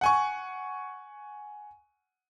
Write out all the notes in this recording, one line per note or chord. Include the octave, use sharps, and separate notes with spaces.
F#5 G#5 C#6